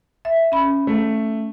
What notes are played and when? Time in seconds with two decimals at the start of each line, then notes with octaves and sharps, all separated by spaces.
0.25 E5
0.52 C#4 B5
0.87 A3